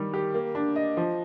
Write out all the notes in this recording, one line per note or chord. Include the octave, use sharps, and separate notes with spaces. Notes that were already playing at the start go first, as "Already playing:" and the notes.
Already playing: D#3 G3
G4
A#3
D4
D#5
F3